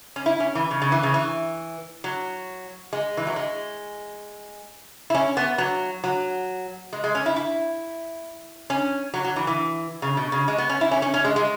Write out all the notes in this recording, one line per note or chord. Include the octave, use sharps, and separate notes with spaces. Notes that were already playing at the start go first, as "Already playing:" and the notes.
C#4
E4
C#4
E3
C#3
C#3
E3
C#3
E3
F#3
G#3
E3
F#3
G#3
E4
C#4
B3
F#3
F#3
G#3
G#3
C#4
E4
E4
C#4
F#3
F#3
E3
E3
C#3
B2
C#3
G#3
B3
C#4
E4
C#4
C#4
C#4
G#3
G#3